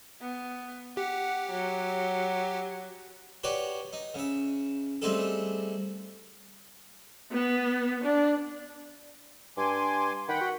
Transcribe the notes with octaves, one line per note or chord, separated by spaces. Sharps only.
B3
G4 F#5
F#3
F#4 G4 B4 C#5 D5
D#4
C#3 E5
G3 A3 C4 D#4 G#4 A4
B3
D4
G2 G#5 C6 D6
D#3 F#5 G5 B5
F#4